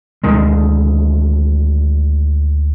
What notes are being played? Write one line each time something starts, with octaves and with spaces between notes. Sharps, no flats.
D2 D3 D#3 G#3